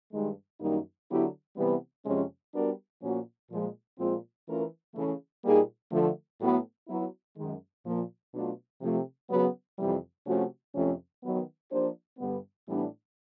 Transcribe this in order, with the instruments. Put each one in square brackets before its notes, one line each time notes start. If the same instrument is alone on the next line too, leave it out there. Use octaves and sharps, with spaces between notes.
[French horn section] G2 D#3 G#3
F#2 D#3 G3 A#3 D#4
D3 F#3 B3 E4 G4
C3 E3 G3 B3
F2 C3 F3 G#3 C#4
G3 B3 D4 F#4 A#4
A#2 F3 A#3 C#4 F#4
A#2 F3 G#3
A#2 F3 G#3 C4 F4
E3 A3 C#4 F4 A#4
C#3 E3 A3
A#2 G3 A#3 D#4 G#4
D3 F3 A3
A2 F#3 B3
F#3 B3 E4
F#2 D#3 G#3
A#2 F3 A#3
B2 F#3 A3 D4 F4
C3 F3 A3
C#3 F#3 B3
F2 C3 E3 G3
C3 F3 A3 C#4 F#4
F2 C3 F3 A3 C#4
D#3 F#3 B3
F3 A#3 D4 G4 C5
G2 D3 G3 B3
A2 E3 G3 B3 D4